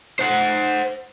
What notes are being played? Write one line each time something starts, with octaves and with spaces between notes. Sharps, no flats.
C5 F#5